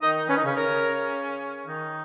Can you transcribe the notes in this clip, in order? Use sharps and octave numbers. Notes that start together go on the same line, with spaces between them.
D#3 D#4 D#5
C#4 B4
D#4
C#3 C#4
C#3 C#4 A#4
D#3 D#4